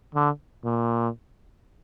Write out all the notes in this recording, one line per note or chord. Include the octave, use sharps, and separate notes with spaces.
D3
A#2